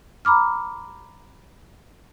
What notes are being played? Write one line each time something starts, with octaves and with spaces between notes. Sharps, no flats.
A#5 B5 D6 F6